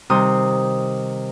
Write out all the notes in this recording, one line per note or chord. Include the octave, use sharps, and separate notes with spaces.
C3 D#3 G3 D#4 C6 D#6